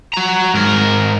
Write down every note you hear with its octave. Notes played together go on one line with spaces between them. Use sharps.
F#4 A#5
G#2 A#4